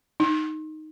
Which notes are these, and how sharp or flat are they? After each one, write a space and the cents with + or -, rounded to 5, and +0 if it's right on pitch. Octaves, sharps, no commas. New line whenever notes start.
D#4 +0